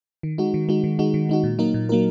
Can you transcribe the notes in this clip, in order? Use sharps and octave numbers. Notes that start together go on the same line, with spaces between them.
D#3
G#3 D#4 F#4
D#3
G#3 D#4 F#4
D#3
G#3 D#4 F#4
D#3
G#3 D#4 F#4
A#2
F#3 A#3 D#4 A#4
A#2
F#3 A#3 D#4 A#4